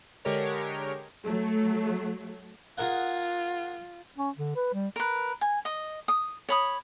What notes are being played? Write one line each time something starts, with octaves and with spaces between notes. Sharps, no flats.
D3 G#3 G4 A#4 C#5
F#3 A3
F4 G#4 A#4 F#5
C#4
D3
B4
G3
A#4 B4
G#5
D#5
D#6
C#5 B5 D#6